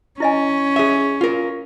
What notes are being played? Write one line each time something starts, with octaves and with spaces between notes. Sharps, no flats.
C#4 E4 D#5 G#5
G#4 E5
F4 A#4